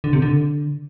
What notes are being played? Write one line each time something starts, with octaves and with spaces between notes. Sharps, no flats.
D3
C3
D3